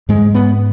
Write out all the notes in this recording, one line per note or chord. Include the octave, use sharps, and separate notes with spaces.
G#2 G#3
B3